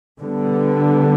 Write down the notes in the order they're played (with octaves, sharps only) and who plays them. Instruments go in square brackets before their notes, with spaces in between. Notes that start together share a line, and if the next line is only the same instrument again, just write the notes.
[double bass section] D3 G3 B3